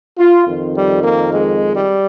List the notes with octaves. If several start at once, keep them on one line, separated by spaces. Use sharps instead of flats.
F4
F2 D#3
G3
A#3
G#3
G3